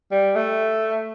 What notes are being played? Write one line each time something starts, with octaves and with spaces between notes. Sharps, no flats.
G3
A3